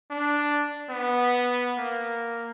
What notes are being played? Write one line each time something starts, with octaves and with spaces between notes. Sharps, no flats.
D4
B3
A#3